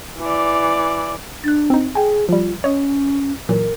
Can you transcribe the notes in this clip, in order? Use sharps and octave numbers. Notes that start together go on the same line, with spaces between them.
E3 D5
D4 F#6 A6
C4 D#4
G#4 G5 G#5
F3 G3 F4
C#4 C#5 D#5
A#2 E3 F#3 A#4